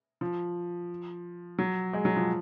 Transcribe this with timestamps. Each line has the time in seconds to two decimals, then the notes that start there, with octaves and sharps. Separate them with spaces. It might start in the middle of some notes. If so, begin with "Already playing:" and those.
0.21 F3
1.58 F#3
1.93 G#3
2.05 F#3
2.16 F3